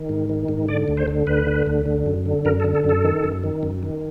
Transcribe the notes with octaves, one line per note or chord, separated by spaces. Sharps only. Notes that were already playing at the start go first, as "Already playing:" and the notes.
Already playing: D#3
G#2
D#3
G#2
D3 D5
D2
C5
D3
D2 B4
D3
D2
D3
F#2
D3
F#2 A#4
A4
D3
A4
F#2
A4
D#3
F#2
D#3
F#2
D#3